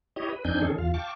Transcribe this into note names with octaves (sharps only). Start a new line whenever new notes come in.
E4 G4 C#5 D#5
B4
F2 C4 D4 D#4 G#5 G6
D#3 C#4 G#4 A4
E2 F4 F5
F5 G5 A5 C#6 D6